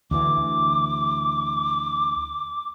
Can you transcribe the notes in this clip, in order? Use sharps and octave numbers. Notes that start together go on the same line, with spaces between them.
D2 E3 D6